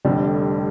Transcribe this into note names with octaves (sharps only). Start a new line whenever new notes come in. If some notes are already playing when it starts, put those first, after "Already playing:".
F1 F2 D3 G3